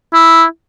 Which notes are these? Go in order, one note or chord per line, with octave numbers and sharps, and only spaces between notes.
E4